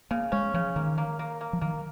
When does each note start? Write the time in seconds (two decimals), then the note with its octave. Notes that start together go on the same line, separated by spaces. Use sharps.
0.11 C#3 A#3
0.32 G#3 C#4
0.54 C#3 F3
0.76 D#3 A#3
0.98 A#3
1.19 A#3
1.41 A#3
1.53 F3
1.61 D#3 A#3